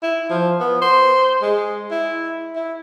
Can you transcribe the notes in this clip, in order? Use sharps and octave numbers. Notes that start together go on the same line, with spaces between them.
E4
F3
B3
C5
G#3
E4
E4